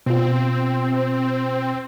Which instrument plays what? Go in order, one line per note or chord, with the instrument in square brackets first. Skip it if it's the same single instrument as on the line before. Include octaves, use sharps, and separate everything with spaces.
[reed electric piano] B2 F4 [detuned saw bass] C4